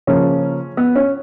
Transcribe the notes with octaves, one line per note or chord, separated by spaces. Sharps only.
C#3 F3 A#3 C#4
B3
C#4